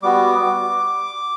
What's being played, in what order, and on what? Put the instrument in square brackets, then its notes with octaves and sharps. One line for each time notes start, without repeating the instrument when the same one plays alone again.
[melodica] G3 B3 F#4 D6